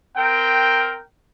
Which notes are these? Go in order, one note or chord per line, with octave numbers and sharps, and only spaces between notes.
C4 A#4 G5